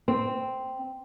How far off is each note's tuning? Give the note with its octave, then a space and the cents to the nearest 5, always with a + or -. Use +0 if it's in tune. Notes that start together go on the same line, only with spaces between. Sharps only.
C4 -5